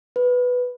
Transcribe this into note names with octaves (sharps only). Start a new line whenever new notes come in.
B4